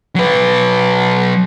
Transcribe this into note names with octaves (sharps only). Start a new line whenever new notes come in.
F#3 B4